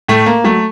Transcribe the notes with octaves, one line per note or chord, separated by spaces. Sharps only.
A2 A3
A#3
F#3 A3